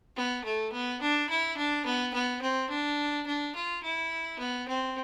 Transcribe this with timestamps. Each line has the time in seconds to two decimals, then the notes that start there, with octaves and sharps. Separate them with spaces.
0.16 B3
0.44 A3
0.72 B3
1.01 D4
1.29 E4
1.57 D4
1.86 B3
2.14 B3
2.42 C4
2.69 D4
3.26 D4
3.55 F4
3.83 E4
4.39 B3
4.68 C4